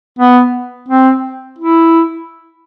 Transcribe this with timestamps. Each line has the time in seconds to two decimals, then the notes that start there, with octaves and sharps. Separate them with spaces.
0.19 B3
0.88 C4
1.58 E4